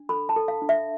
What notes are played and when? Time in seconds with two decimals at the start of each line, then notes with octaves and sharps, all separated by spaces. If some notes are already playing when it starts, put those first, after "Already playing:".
Already playing: D4
0.09 A4 B5
0.29 A5
0.36 A4
0.48 F5
0.62 D4
0.69 E5